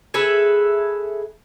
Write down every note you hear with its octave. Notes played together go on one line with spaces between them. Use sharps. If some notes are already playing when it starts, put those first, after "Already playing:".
G#4 A4 B4 E5